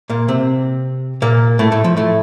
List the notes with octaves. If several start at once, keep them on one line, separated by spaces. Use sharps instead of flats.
A#2 A#3
C3 C4
A#2 A#3
A2 A3
A2 A3
F3
A2 A3